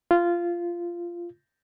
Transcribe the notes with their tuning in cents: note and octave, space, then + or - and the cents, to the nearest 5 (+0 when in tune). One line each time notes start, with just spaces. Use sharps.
F4 -15